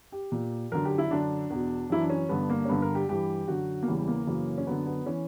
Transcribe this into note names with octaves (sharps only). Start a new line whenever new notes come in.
G4
A#2
F#2 D3 A#4
G4
E4
F#2 D3 D4
E2 B2
F#2 E3 E4
D4
C#4
G2 D3 B3
A#3
C#4
G2 D3 B3
A#4
G4
G2 E3 G4
F#2 D3 F#4
A#3
E2 C#3 E3 G3
G3
A#3
F#2 C#3 E3
C#4
F#2 D3 B3
B3
E3 C#4